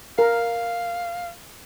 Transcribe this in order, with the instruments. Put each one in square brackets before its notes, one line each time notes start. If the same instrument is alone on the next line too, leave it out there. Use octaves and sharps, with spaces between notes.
[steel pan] A#4 [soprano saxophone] F5